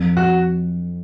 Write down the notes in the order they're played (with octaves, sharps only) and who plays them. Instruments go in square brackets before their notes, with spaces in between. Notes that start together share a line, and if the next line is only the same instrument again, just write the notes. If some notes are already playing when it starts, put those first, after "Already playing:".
Already playing: [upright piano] F2
[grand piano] F#4